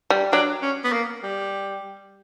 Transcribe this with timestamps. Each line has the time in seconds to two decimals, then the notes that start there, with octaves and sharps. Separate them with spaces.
0.10 G3
0.33 F#3 D4
0.62 C#4
0.84 B3
0.92 A#3
1.23 G3